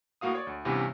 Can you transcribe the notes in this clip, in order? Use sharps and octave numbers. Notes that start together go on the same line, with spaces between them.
A2 A#3 F#4 F5 D#6
C#5 D5
D2
G2 C3 E3 B3 C#4 G4